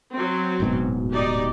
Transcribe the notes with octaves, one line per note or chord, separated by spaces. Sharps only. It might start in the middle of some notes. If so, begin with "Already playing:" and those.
F#3 C4
D1 G#2 B2
D#4 G4 D5